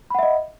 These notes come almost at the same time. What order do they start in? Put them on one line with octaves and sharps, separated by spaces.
B5 F#5 E5 D#5